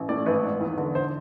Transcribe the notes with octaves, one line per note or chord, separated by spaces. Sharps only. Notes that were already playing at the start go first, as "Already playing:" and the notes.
Already playing: A1
A2 D5
G#1 B4
G#2
E2
D3
C5